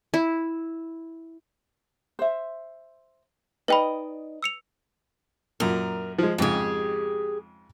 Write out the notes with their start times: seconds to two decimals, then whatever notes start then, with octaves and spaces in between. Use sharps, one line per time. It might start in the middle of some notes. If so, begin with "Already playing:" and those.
0.14 E4
2.19 C5 E5
3.68 D#4 B4 D5 D#5 G5 B5
4.43 E6 C#7 F7
5.60 F#2 A#2 A#4
6.18 F3 G#3
6.38 F2 G#2 C#3 G4 G#4